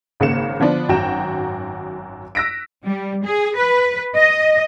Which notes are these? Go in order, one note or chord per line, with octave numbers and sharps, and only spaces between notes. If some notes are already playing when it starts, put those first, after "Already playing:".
G#1 C#3 A#3 C#7 E7
D3 F3 B3 D4
G#1 F#2 F#4 G5 A#5 E7
E6 F#6 A#6 B6 D7
G3
G#4
B4
D#5